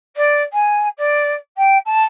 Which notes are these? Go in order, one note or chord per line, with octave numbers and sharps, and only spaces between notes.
D5
G#5
D5
G5
A5